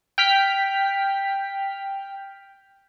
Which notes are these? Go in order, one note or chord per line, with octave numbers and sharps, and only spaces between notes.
G5 F6 B6